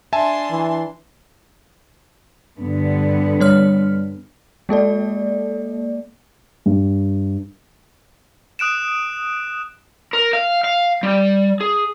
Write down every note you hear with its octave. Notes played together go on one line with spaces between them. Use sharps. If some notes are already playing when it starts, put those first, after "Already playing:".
D4 E5 G#5 A5 C6
E3
G2 D3 B3
G3 C#5 F6
G#3 A#3 A4 D5
G2
D#6 F#6 D7 E7
A#4
F5
F5
G3
G#4